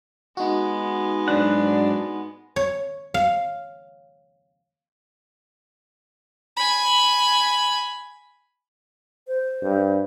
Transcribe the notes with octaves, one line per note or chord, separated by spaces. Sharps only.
G#3 B3 D#4 F#4
G#2 F#3 D4 F#5
C#5
F5
G#5 B5
C5
G2